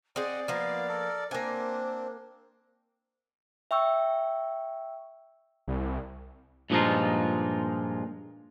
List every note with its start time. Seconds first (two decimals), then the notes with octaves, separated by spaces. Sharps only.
0.16 C4 G#4 D5 D#5 F#5 G5
0.48 F3 A#3 B3 F5
0.89 A4 A#4
1.31 A#3 C4 D4 C5 G#5
3.71 E5 G5 C#6 E6
5.68 C2
6.70 G2 A#2 F3 G#3 D#4 F4